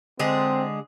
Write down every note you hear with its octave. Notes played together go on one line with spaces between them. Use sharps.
D3 G#3 C4 G#4